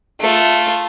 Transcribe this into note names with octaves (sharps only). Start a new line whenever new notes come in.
A3 F4